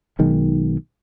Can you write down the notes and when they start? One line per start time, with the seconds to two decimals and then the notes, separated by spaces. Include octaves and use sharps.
0.19 B1 D#3 G#3